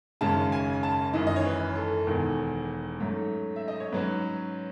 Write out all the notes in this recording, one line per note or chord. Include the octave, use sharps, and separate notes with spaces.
G#1 F#2 C#3 G#3 C#4 A5
G#5
A5
G#1 F#2 E3 D#5
D#5
C#5
B4
A4
E1 E2 D#3
G#2 F#3 A3 C#4
E5
D#5
C#5
G#2 F#3 C#4 B4